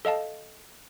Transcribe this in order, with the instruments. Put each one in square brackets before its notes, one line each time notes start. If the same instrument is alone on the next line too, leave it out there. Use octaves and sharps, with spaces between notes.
[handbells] A4 D#5 F5 A5